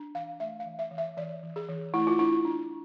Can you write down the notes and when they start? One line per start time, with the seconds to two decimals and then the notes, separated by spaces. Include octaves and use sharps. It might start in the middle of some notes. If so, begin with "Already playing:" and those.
Already playing: D4
0.15 E3 F5
0.40 A3 E5
0.60 F5
0.66 E3
0.79 E5
0.91 E3
0.98 E5
1.17 E3 D5
1.43 E3
1.56 G#4
1.68 E3
1.94 A3 E4
2.07 F4
2.19 D4 E4
2.45 D4